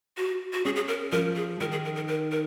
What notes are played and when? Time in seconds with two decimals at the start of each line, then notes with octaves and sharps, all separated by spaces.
0.17 F#4
0.53 F#4
0.65 C#4 G#4
0.76 G#4
0.88 A#4
1.12 F3 A#4
1.36 G#4
1.60 D#3 A#4
1.72 G#4
1.85 A#4
1.96 A#4
2.08 A#4
2.31 A#4